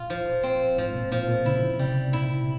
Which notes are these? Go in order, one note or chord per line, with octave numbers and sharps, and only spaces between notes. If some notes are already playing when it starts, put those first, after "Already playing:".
Already playing: A#2 F4
F3
C4
G#2 F3
A#2
A#2 F3
A#2
C#3 E4
C3 G3
A#2 E4